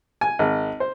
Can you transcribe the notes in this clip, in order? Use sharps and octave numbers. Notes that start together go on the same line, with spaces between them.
G#5
G#1
C5